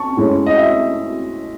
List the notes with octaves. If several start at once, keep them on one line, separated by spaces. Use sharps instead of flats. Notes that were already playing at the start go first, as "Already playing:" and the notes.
Already playing: A5 C#6
A2 G#3 C#4
D#5
E5